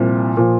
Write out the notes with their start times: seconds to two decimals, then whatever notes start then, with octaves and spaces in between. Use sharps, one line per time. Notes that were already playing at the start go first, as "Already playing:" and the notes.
Already playing: C2 A#2 F3
0.37 A#2 F3